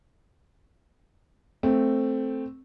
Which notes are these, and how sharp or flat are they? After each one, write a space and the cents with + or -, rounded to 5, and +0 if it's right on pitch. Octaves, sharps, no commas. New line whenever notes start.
A3 +0 C4 +0